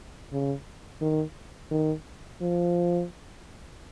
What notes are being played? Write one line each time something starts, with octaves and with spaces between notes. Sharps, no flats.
C#3
D#3
D#3
F3